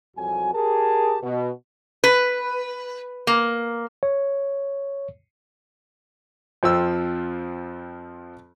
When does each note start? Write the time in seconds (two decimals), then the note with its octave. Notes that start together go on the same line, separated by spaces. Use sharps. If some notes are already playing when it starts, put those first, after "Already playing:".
0.17 C2 F2 F#3 F#4 G#5
0.54 G4 G#4 A#4 A5
1.22 B2
2.04 B4
3.27 A#3
4.03 C#5
6.63 F2 F3 C4 E6